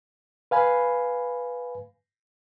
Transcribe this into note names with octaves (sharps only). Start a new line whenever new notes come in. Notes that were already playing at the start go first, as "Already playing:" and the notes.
B4 F5 G#5 B5